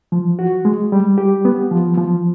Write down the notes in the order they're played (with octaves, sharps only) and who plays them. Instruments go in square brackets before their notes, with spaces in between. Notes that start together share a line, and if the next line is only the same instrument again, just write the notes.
[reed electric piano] F3
F#4
G#3
G3
G4
B3
F3
F3